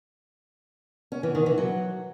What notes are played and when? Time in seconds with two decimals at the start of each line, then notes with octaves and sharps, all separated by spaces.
1.12 C#4
1.23 E3
1.35 D#3
1.46 E3
1.58 F#3